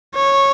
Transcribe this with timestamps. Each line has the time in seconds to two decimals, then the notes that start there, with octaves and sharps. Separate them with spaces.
0.15 C#5